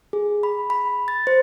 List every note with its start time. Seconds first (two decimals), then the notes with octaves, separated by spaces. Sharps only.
0.13 G#4
0.43 B5
0.70 B5
1.08 A6
1.27 C5